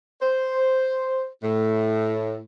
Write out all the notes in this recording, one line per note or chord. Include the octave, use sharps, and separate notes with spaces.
C5
A2